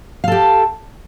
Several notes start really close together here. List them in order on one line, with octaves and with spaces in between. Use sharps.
F5 A4 G4